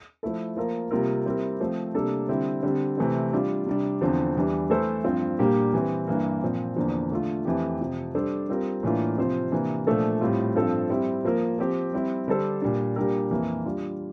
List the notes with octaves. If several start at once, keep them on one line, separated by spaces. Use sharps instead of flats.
F3 A3 E4 A4
F3 A#3 F4 A#4
C3 G3 A#3 F4 A#4
G3 C4 E4 G4 A#4
F3 A3 C4
C3 G3 A#3 D4 A4
D3 G3 C4 E4
D3 G3 C4
C3 E3 A3 C4
G3 D4 F4
C3 G3 D4
E2 D3 F3 C4
E2 E3 G3 D4
E3 A3 E4 A4 C5
G2 F3 C4 F4
A#2 G3 A#3 D4 G4
E3 G3 C4
G2 E3 A#3
A#2 F3 C4
E2 D3 F3 A#3 D4
D3 A3 D4 F4
F2 E3 A3 E4 G4
F2 C3 F3
G3 D4 A4 C5
G3 C4 F4 A#4
A2 E3 A#3 D4 F4
C3 F3 C4 F4 C5
C3 E3 A#3 D4
A#2 F3 A3 D4 A4
A2 G3 C4 F4
G2 F3 C4 F4 A4
G3 C4 E4
F3 A#3 F4 A#4
F3 C4 G4
G3 C4 E4
D3 G3 D4 A4 C5
A#2 G3 D4
A#2 G3 D4 G4 A#4
F2 E3 A#3
G3 D4 F4